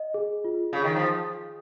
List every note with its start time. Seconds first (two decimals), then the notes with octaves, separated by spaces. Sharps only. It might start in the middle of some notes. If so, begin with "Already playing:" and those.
Already playing: D#5
0.14 G#4
0.44 F4
0.73 C#3 G#4
0.84 D#3
0.96 F3